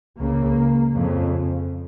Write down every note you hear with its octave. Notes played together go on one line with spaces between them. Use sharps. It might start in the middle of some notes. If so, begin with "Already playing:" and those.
C#2 C#3 A#3
F2 C#3